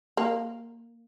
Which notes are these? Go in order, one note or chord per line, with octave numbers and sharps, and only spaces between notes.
A#3